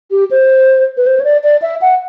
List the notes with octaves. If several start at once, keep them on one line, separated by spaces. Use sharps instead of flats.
G4
C5
B4
C5
C#5
D5
D5
E5
F#5